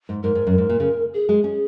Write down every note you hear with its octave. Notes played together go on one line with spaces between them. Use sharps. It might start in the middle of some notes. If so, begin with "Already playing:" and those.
G#2
G#2 A#4
G#2
F#2
G#2
A#2
C#3
G#4
G#3
C#4